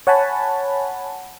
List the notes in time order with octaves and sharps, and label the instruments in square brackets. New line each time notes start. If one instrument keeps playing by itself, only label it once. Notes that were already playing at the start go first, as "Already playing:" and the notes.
[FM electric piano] C#5 F#5 G#5 A5 B5